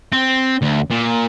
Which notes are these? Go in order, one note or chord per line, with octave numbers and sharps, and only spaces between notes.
C4
D2
A#2